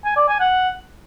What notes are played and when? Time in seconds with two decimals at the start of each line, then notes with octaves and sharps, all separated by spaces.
0.04 G#5
0.16 D5
0.28 G#5
0.40 F#5